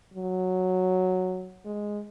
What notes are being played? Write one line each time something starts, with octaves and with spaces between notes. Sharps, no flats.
F#3
G#3